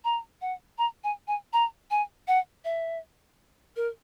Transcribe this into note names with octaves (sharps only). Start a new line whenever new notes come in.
A#5
F#5
A#5
G#5
G#5
A#5
G#5
F#5
E5
A#4